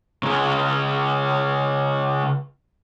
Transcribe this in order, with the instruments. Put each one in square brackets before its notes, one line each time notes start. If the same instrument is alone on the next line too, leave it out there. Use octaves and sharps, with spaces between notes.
[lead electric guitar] C#3 G#3